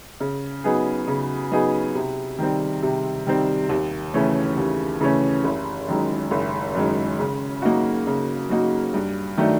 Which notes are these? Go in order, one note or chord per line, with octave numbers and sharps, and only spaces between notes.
C#3
F#3 B3 D#4 G#4
C#3
F#3 B3 D#4 G#4
C3
D#3 G3 C4
C3
D#3 G3 C4
D#2
C#3 E3 A3 C#4
D#2
C#3 E3 A3 C#4
F#1
F#2 D#3 G#3
F#1
F#2 D#3 G#3
C#3
F#3 A#3 D#4 F#4
C#3
F#3 A#3 D#4 F#4
G2
D#3 F#3 A3 D4